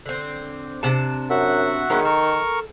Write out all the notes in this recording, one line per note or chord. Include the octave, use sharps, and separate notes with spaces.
D3 C4
C3 D4 A5
F#2 F#4 E5 F#5
D#3 G#3 B3 C#4
A4 A#4 C#6